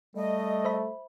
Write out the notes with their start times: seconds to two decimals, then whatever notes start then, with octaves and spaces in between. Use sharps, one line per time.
0.16 G3 A3 D#5
0.65 C5 E5 B5